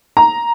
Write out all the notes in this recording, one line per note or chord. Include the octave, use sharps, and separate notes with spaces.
A#5